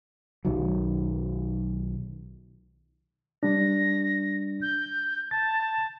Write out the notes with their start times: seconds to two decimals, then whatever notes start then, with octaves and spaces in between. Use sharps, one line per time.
0.45 B1 D#3 F#3
3.43 G3 D4 A#6
4.62 G6
5.31 A5 A6